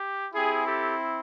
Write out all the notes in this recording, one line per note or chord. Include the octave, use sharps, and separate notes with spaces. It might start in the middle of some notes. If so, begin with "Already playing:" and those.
Already playing: G4
C4 E4 G4 G#4
G4 A4